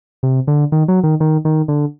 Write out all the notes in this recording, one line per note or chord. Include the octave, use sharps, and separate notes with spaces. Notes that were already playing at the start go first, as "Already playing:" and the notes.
C3
D3
D#3
F#3
D#3
D#3
D#3
D3